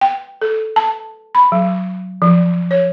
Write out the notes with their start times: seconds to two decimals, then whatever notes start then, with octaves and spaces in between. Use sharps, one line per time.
0.01 G5
0.42 A4
0.76 A5
1.35 B5
1.52 F#3
2.22 F3
2.71 C#5